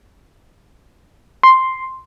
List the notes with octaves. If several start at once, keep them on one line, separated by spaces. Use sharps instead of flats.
C6